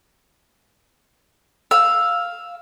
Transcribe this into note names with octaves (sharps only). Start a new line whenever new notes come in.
F5 E6